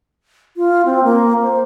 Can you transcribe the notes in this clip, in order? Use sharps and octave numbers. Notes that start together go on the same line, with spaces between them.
F4
C4
A#3
C5